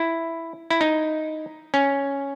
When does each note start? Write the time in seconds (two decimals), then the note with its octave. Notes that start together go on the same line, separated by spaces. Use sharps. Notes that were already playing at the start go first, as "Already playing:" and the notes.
Already playing: E4
0.70 E4
0.81 D#4
1.74 C#4